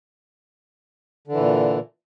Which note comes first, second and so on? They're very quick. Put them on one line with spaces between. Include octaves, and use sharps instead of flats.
D3 E3 A#2